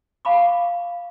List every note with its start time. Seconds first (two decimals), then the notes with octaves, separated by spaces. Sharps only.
0.25 F5 A5 B5 C#6 D6